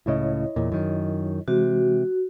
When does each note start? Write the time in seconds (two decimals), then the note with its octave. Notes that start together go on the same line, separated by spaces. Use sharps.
0.06 C#2 A2 C#3 E4 C#5 D#5
0.56 E2 A#2
0.72 F#2 D#3
1.48 C3 E3 G#3 F#4